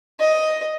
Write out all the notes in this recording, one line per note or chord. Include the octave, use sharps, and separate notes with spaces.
D#5